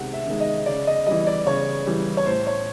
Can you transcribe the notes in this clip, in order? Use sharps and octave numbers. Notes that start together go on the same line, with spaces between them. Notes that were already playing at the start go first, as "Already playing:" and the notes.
Already playing: C3 D#3 G#3 F#5
E5
D#3 G#3
D#5
C#3 D5
D#5
E3 G3 D#5
D5
C#3 C#5
E3 G3
C#5
A2 C5
C#5